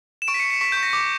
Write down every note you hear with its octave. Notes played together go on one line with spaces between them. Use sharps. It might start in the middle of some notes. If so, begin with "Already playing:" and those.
E7
C#6 D7
B6
C#7
C#6
C#7
C#6 B6
G6
C#6
A#6
D6